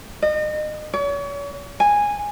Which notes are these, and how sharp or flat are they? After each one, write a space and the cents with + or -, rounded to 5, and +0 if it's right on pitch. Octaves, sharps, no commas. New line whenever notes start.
D#5 -35
C#5 +40
G#5 -10